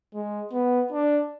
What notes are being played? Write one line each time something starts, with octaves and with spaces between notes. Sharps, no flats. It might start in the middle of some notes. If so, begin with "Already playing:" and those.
G#3
B3
D4